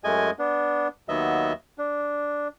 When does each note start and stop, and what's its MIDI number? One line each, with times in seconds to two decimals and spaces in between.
0.04 0.31 42
0.04 0.31 56
0.04 0.31 57
0.04 0.31 75
0.04 0.31 80
0.39 0.88 59
0.39 0.88 62
1.09 1.53 39
1.09 1.53 54
1.09 1.53 59
1.09 1.53 75
1.09 1.53 76
1.78 2.48 62